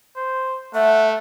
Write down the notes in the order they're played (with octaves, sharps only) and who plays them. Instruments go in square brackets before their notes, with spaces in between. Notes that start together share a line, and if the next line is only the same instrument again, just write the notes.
[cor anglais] C5
[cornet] A3 [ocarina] E5 [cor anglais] F#5